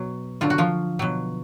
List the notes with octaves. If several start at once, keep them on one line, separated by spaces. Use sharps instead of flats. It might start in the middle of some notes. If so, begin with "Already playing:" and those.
Already playing: B2 F#3
D3 F#3 F4
F#4
F3 F4
B2 F#3